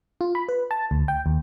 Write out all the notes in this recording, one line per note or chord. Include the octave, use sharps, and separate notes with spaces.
F4
B5
B4
A5
D2
G5
D#2